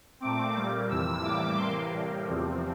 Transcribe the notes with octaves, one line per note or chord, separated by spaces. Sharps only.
A#2 A3 C4 D6
A#2 G3 A#3
F2 C3 E3 E6
A2 E3 G3 A#3 D6
C3 E3 A#3 C6
A2 G3 A#3
E2 C3 F3 C4